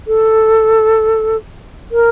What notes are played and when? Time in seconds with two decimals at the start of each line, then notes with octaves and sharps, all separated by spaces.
0.07 A4
1.91 A#4